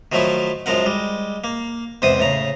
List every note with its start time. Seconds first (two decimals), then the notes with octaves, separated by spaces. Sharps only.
0.12 D#3 F3 F#3 A3 E4
0.66 F#2 F3 G#3 A#4 F#5
0.86 G3 G#3
1.44 A#3
2.02 E2 G#2 C3 C5 D#6
2.19 A2 C#3 A#5